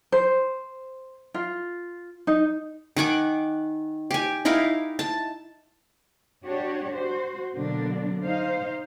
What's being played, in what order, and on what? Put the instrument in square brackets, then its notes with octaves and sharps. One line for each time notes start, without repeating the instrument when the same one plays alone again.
[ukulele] C5
F4
D#4
[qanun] D#3 F#5 G#5 D6
G4 G#5
D#4 E4 A#4 F5
A5
[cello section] D4 F#4 G4 C#5
F#4 C5
B2 D3 F#3 A#3 D4
D#4 C5 F5